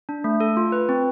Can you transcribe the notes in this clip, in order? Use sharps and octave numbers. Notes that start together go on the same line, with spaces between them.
D4
A3
A4
F4
B4
C4